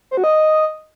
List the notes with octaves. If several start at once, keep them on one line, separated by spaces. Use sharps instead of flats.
C5
F#4
D#5